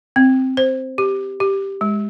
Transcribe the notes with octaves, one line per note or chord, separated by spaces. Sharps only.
C4
C5
G4
G4
G#3